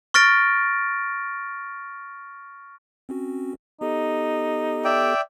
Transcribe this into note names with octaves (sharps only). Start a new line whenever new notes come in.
C#6 F6 A6 A#6 D7
C4 C#4 F#4
B3 D#4 G4 A4
D5 E5 G5